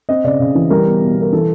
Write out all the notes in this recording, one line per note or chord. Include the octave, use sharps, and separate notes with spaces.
C4 D#5
C#3 D5
C#3
E3
G3 A#4
B2
B2
B2 A#4
E3 A4